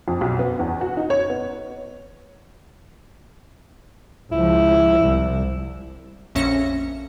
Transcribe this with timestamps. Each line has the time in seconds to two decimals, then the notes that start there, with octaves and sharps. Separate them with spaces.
0.08 F2
0.21 B1
0.39 B3
0.59 E2
0.81 F#4
0.97 D#4
1.10 C#5
1.30 B3
4.32 C#2 F3 E4
4.99 C2
6.35 A#1 F2 C#4 E5 A#6 C#7